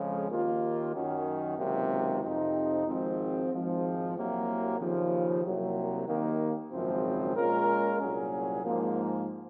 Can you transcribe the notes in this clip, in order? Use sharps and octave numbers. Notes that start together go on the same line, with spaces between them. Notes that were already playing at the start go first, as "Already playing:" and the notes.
Already playing: F2 C#3 F3 G#3 C#4
D#2 D#3 A#3 F4
F#2 D#3 F#3 C#4 F#4
C#2 C3 D#3 F#3 A#3
F2 C3 F3 C4 D#4
G#1 G#2 F3 C4
G#1 G#2 F3 C4
C2 C3 F#3 A#3
D#2 C#3 F3
C2 C3 F#3 A#3
D#2 D#3 A#3
G#1 F#2 C#3 F3 C4
A#2 G#3 C#4 F4 A#4
C2 A#2 F#3 C#4 G#4
G#2 F3 A#3